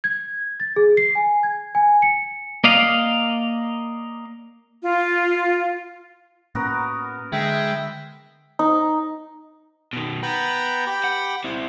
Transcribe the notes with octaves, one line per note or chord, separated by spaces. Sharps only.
G#6
A6
G#4
C7
G#5
G#6
G#5
C#7
A#3 D5 D#5 F5
F4
A2 A#3 B3 C#4 F#4 A#4
D3 G#3 E5 G5
D#4
B2 D#3
B3 G5 A#5 B5
G4 G5 B5
F#5
C4 E4